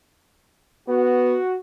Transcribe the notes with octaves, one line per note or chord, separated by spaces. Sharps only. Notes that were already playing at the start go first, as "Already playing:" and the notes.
B3 F#4